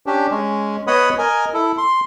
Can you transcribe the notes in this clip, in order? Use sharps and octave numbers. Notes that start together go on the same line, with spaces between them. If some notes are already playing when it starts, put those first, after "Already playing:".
C#4 D4 G4
G#3 C#4
B3 C#5 D#5 F#5 B5 D#6
A#4 D#5 G#5
E4 A4
C6